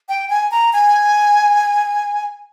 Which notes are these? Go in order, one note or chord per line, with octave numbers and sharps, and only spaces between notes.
G5
G#5
A#5
G#5